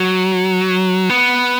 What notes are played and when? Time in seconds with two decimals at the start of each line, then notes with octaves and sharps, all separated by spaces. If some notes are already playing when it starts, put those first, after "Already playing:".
Already playing: F#3
1.10 B3